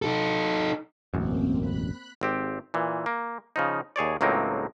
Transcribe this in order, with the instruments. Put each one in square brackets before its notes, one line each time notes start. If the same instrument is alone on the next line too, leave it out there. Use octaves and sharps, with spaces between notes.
[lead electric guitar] D#4 A4
[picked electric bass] E1 A1 F#2 [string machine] A#3 C4
[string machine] B5 F#6
[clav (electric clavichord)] G#1 C4 G4
A#2 E3
A#3
C#3 F3 D#4
D#2 G#4 C#5 D5
C#2 A2 F#3 A#3 C4 D#4